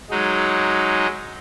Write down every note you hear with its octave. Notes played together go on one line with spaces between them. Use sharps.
F#3 G#3 D#4